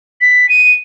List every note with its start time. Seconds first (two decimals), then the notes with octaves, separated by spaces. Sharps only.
0.21 B6
0.49 D#7